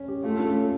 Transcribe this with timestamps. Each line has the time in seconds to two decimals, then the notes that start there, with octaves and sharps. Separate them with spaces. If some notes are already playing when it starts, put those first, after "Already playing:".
Already playing: C#4
0.08 G4
0.24 A3 F4
0.39 C#4
0.55 A3